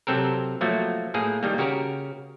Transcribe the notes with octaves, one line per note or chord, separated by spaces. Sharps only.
C3 F#3 C4 A4 A#4
F3 F#3 A3 A#3 F#4
A2 A#3 G#4
D#3 G3 A#3
C#3 F#4 G4 A#4